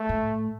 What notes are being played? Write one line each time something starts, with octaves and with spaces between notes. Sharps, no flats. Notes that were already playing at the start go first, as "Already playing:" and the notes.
Already playing: A3
A2